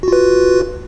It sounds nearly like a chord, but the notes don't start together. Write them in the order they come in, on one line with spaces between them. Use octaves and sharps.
F#4 F4 B4